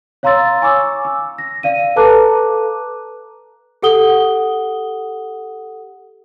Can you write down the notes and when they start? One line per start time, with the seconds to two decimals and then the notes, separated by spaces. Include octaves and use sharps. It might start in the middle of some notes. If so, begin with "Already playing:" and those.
0.23 C#5 F5 A#5 C6 E6 A6
0.62 G#5 C#6 D6 E6
1.05 E6
1.38 A#6
1.63 D5 F5 D#7
1.96 A4 B4 A5 A#5 D6 F#6
3.82 G4 A4 F#5 D#6 G7